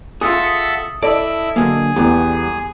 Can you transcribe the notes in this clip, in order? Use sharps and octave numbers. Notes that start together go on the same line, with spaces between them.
F4 G#4 A4 E5 F#5 D#6 C#7
E4 A4 D5 D#5 D7
D3 F#3 A#3 G#4
E2 G3 A3 B3 G4